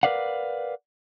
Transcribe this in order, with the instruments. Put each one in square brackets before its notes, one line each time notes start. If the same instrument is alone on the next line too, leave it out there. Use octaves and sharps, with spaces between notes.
[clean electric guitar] A#4 B4 D5 F5 F#5